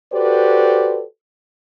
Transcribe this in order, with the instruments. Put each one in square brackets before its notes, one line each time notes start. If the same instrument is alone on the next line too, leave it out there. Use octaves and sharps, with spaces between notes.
[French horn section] F#4 G4 A4 B4 C5 D5